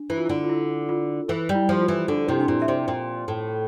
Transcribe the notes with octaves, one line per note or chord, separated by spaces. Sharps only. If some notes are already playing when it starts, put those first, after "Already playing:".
Already playing: D4
E3 E4
F4
E4
D3
F4
E4
F4
E3 A4
G3
E4
F3 G4
F4
E3
D3 D4
C3 E4
D4
A#2 E4
E5
C3 D5
A#2 G5
A2